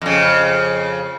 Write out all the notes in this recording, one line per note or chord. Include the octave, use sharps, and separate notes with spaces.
F2 C#3